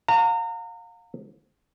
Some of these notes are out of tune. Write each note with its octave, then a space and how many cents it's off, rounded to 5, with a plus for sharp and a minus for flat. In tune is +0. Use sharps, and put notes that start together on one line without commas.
F5 +35 A#5 -30